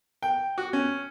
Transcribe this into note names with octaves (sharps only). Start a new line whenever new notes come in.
G5
F#4
C#4